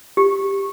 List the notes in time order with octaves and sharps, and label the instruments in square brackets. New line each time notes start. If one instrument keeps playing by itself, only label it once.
[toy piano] G4